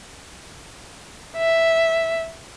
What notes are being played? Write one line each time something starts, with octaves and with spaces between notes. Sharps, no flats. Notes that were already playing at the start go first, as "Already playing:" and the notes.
E5